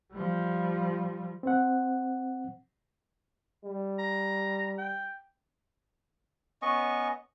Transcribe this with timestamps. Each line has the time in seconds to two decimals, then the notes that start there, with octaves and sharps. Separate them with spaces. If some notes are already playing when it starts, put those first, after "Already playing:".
0.12 F3 G3
1.43 C4 C5 F#5
3.64 G3
3.98 A#5
4.78 G5
6.62 B3 C#4 D#5 C#6